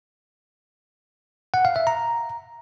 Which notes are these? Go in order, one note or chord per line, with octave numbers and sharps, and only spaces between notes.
F#5
F5
E5
A#5